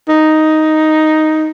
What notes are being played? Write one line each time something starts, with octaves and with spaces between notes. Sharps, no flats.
D#4